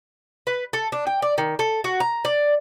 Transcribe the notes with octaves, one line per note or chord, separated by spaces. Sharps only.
B4
A4
D4
G5
D5
D#3
A4
F#4
A#5
D5